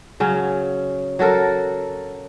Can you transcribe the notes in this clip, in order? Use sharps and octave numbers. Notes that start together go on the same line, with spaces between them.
C#3 F#3 C#4
F#3 F#4 A4 A#4